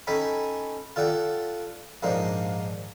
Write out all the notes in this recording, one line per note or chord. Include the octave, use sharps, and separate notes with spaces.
C#4 D#4 A4 G5 G#5 B5
F4 A4 D5 F#5 G5
A#1 G#2 A#3 D4 D#4 C5